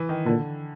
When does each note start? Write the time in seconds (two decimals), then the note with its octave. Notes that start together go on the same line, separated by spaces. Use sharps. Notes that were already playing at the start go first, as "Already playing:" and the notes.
Already playing: E3
0.09 D#3
0.25 A#2 D3